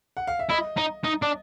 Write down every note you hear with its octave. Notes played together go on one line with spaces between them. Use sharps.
F#5
F5
E5
E4 D#5
D#4
D#4
D4